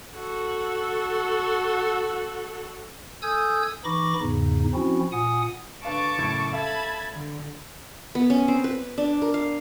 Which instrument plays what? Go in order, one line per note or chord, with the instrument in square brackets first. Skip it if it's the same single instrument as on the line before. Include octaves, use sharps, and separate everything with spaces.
[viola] F#4 A4
[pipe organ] A4 G#5 D#6 E6 G6 G#6
E3 D#4 B5 C#6 D6 A#6
E2 G#2 C#3 D#4
F3 C4 C#4 E4 F#4
A#2 F#5 G#5 D#6
[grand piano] D3 B4 F5 [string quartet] A5 C#6 D6
[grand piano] F#1 A2 G#6
[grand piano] A4 E5 F5 [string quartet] A5 B5 G#6
[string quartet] D3
[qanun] B3
C#4
C4
B4
D4
A#4
F5